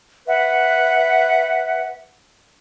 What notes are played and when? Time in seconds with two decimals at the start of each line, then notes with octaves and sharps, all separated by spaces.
0.27 B4 E5 F#5